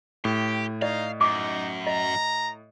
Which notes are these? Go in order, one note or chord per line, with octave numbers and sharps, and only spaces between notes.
A2 G4
D#4 D5 D#5 F5
F#2 D#4 D6
D#5 A#5